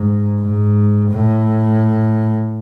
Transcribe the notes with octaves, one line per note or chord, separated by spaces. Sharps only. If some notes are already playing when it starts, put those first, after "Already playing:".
Already playing: G#2
G#2
A2